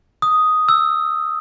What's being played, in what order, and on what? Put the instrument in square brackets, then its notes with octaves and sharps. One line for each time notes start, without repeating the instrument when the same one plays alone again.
[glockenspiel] D#6
E6